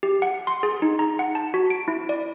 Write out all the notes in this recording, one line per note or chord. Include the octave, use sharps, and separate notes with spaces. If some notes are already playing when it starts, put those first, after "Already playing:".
G4
F#5
C6
G#4
D#4
A#5
F#5
A5
F#4
D7
E4
D5